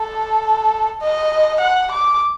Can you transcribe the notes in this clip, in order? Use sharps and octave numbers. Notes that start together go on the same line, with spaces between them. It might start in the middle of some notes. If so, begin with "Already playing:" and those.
Already playing: A4
D#5
F#5
D6